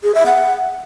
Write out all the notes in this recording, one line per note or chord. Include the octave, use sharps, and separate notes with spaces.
G#4
E5
F#5